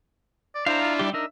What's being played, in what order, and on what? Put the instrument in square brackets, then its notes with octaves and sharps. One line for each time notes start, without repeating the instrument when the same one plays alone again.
[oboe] D5
[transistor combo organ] D4 E4 [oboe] C5 [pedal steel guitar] F5 A#5
[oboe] F4
[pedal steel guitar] G3 G4
[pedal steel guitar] D4 D#4 A#4 [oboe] E5